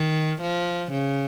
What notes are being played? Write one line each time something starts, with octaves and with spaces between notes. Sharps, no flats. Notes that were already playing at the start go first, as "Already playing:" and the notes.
Already playing: D#3
F3
C#3